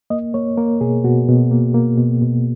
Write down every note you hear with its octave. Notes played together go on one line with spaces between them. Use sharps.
A#3 D#5
A#3 C#5
A#3 A#4
B2 G#4
B2 F#4
B2
A#3
A#3
B2
B2